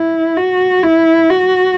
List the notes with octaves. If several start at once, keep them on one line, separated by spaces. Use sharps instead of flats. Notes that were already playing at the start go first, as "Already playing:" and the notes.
Already playing: E4
F#4
E4
F#4